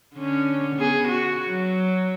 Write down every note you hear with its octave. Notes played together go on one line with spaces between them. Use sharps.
D3 C#4
B3 G#4
F#4
F#3